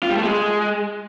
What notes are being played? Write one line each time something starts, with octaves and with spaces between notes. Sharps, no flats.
F4
G3
A3
G#3